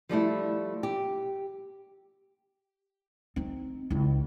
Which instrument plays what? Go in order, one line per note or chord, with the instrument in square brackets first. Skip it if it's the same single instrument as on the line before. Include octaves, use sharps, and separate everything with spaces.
[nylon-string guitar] F3 G3 A3 E4
G4
[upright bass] C4 D#4
C#2 E4